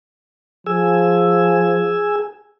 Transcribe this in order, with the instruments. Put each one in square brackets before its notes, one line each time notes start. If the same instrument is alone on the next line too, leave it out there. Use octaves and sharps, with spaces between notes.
[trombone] F3 [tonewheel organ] G#4 G#5 E6